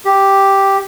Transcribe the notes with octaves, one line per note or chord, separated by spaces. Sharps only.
G4